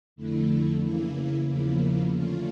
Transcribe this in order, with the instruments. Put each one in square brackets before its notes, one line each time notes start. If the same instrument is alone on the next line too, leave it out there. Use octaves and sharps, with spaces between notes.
[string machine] F2 D3 A3 E4
C#3 E3 A#3 E4
E2 C#3 F3 A#3 E4
D3 A3 C#4 F4